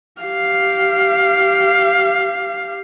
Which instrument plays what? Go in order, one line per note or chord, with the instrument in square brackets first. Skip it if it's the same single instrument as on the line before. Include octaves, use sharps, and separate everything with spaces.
[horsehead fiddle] G4 F5